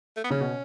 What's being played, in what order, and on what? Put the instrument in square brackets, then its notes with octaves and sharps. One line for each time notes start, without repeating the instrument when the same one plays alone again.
[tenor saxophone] A3
B3
[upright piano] C#3 [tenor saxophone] C#4
[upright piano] B2